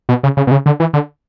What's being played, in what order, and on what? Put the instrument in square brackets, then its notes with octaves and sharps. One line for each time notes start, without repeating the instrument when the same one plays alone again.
[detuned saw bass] B2
C#3
C#3
B2
C#3
D3
E3
D3